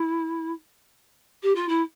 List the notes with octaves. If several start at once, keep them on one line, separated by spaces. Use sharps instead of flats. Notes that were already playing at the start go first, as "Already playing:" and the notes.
Already playing: E4
G4
F4
E4